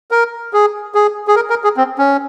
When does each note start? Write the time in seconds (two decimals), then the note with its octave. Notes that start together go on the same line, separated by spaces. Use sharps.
0.11 A#4
0.53 G#4
0.95 G#4
1.28 G#4
1.36 A#4
1.50 A#4
1.64 G#4
1.77 C4
1.98 C#4